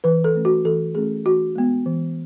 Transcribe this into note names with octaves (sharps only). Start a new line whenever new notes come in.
E3 B4
A4
A3 C#4
F#4
E3 A4
A3 C#4 G#4
E3 F#4
G#3 B3
E3